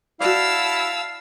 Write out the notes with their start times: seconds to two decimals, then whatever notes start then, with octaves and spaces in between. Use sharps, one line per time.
0.20 E4 F#4 D5 F5 A5 E6